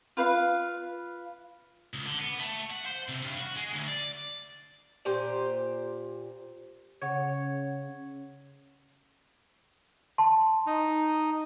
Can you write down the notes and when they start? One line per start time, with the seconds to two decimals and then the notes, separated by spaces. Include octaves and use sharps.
0.17 F4 B4 F5
1.94 C#2
2.06 D3
2.21 B3
2.40 A3
2.71 F#5
2.86 C5
3.08 C3
3.22 G2
3.38 F#4
3.56 G#3
3.74 D2
3.88 D5
5.05 A#2 G4 C5 G5
7.02 C#3 C#5 F#5 G#6
10.18 A5 C6
10.67 D#4